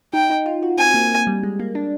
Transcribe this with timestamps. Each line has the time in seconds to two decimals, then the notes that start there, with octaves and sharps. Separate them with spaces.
0.13 D#4 G5
0.30 D#4
0.46 F4
0.63 F#4
0.78 C4 G#5
0.94 A#3
1.27 G3
1.43 G#3
1.59 A#3
1.75 D4